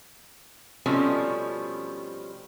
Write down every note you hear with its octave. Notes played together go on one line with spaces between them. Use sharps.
B2 F3 G3 A3 C4 C#4